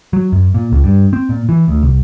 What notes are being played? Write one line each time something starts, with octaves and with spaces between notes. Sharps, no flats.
F#3
F#2
A#2
C#2
G2
C4
A#2
E3
D2
C2